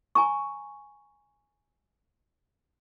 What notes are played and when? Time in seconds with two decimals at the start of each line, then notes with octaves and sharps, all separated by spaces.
0.15 G#5 A#5 C#6